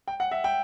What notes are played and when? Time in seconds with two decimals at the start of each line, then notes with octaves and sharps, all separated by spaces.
0.08 G5
0.20 F#5
0.31 E5
0.44 G5